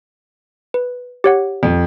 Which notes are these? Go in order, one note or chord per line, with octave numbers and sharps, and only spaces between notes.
B4
G4 C#5 F#5
F2